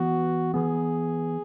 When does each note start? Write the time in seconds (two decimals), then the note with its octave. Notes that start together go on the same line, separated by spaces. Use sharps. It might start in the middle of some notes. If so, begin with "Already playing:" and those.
Already playing: E3 B3 F#4
0.54 E3 B3 G#4